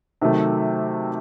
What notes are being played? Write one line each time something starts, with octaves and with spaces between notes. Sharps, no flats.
C3 D#3 F#3 A3